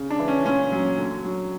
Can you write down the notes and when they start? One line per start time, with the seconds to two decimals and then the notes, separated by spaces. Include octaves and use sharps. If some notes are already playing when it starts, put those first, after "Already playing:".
Already playing: C#3
0.10 D4
0.19 E3
0.28 C#4
0.46 A#2 C#4
0.72 F#3
0.98 D3
1.24 F#3